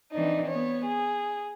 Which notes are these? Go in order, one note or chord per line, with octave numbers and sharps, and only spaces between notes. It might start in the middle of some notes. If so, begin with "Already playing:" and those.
E3 C4 D4 D#4
B3 C#5
G#4